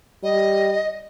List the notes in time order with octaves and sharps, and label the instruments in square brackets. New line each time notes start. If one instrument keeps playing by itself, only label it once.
[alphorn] G3 [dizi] D#5